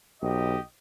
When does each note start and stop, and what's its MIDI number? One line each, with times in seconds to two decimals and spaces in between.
0.22 0.57 35
0.22 0.59 67
0.22 0.59 75